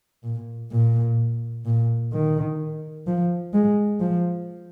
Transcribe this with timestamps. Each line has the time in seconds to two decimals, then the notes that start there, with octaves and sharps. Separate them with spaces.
0.23 A#2
0.71 A#2
1.65 A#2
2.13 D#3
3.07 F3
3.53 G#3
4.00 F3